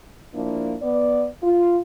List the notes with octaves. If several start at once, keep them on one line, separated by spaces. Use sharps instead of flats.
F3 A#3 D4 E4
B3 D5
F4